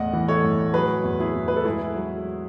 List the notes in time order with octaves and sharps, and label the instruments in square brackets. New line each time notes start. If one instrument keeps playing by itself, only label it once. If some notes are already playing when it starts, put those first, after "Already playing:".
Already playing: [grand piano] E2 A2 D#5 F#5
E3
A4 C#5
A2
F#3 G#4 B4
E2
E4 G#4
E2
B4
A4
G#2 E4 G#4
F#3